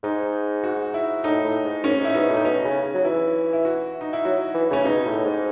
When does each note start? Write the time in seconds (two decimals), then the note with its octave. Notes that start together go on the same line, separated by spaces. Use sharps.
0.03 G#2 D#4
0.64 F#4
0.94 E4
1.24 A2 D#4
1.44 A2
1.65 G#2
1.84 F#2 C#4
1.99 G#2
2.05 E4
2.14 B2 D#4
2.30 A2
2.37 D#4
2.44 B2 C#4
2.65 C#3
2.94 F#3
3.04 E3 E4
3.53 E4
3.65 F#4
4.01 D#4
4.13 E4
4.25 F#3 F#4
4.54 E3
4.70 C#3 C#4
4.85 B2 D#4
5.06 A2
5.25 G#2